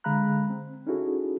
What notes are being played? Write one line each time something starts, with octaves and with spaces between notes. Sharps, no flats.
D3 G#3 F5 A#5 B5 F#6
C4
C#4 D#4 E4 F#4 G#4 A4